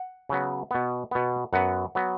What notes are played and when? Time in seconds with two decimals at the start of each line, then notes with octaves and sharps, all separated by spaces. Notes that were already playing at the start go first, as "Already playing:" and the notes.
Already playing: F#5
0.29 C#3 F#3 B3
0.71 B2 B3
1.11 B2 B3
1.53 F#2 F#3 B3 F#5
1.95 F#3 B3